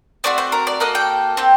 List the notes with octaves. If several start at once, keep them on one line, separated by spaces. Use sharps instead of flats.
A3 C4 F#4 D5
C5
A#4
D5
A#3 F#4 A4 D#5
G5
C4 G4